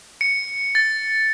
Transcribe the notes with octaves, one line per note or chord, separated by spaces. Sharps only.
C#7
A6